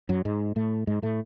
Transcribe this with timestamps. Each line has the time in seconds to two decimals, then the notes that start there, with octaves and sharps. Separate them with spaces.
0.09 F#2 F#3
0.25 G#2 G#3
0.56 A2 A3
0.87 G#2 G#3
1.02 A2 A3